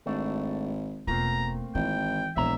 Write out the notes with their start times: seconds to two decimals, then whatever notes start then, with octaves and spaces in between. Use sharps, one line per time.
0.06 G#1 A3 D4 F#4
1.07 E1 A3 A#3 C4 F4 A#5
1.75 G#1 E3 G5
2.36 E1 A#1 F2 E4 E5 A#5